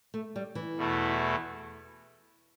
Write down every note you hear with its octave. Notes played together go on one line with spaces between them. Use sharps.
A3
G3
E3
E2 B2 A3 E4